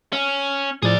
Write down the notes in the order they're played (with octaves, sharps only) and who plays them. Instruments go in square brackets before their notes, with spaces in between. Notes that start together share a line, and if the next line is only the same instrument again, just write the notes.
[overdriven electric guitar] C#4
[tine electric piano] A2 F3 [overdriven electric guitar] G#4 D5